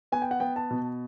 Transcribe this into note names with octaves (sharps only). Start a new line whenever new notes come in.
B3 G#5
G5
F#5
B3 G5
A5
B2